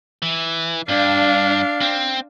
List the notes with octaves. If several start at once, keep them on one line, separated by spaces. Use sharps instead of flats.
E3
G2 D4 F5
C4